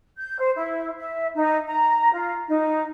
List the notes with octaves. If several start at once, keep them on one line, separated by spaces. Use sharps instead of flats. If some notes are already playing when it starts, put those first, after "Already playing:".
G6
C5
E4
E5
D#4
A#5
F4
D#4